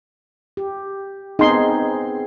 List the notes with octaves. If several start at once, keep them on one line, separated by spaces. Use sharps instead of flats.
G4
B3 C4 D#4 G#4 C6